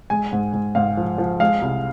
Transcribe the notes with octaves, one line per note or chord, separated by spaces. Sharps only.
G#3 G#5
G#2
G#2
G#2 F5
F3
F3
G#3 F5
C2